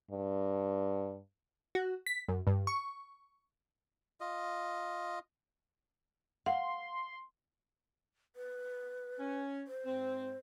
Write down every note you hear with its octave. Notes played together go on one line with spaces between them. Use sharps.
G2
F#4
B6
F#2
G2
C#6
F4 D#5
F5 F#5 C6
B4
C#4
C5
G#2 C4